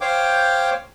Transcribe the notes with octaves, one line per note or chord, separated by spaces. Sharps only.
C5 C#5 F5 G5 D6